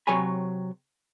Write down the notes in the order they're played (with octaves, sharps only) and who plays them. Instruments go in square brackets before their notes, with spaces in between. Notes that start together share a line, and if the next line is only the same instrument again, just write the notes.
[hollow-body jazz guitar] C3 F#3 C#5 G5 G#5 B5